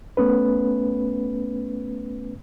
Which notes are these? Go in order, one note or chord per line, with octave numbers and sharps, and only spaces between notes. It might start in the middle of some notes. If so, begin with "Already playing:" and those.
A3 B3 C#4 B4